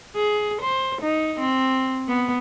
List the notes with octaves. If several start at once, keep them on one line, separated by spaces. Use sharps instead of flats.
G#4
C5
D#4
C4
B3